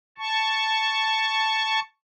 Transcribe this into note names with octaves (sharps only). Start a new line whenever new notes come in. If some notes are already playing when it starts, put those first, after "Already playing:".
A5 C#6